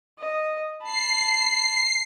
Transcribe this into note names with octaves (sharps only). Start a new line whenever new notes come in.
D#5
A5 B5 C7